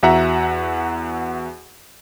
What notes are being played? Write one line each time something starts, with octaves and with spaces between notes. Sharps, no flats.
E2 F#4 E5 F#5 A#5